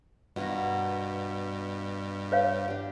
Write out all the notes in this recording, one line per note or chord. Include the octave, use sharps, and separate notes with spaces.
G2 B2 A#3 F#4
B4 C#5 F5
D4 G4